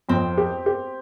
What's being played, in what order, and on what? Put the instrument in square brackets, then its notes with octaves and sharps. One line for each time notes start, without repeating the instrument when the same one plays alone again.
[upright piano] F2 [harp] C4
[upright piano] G4
G4